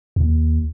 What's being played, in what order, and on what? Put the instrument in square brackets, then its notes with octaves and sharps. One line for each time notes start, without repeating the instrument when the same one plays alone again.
[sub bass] D#2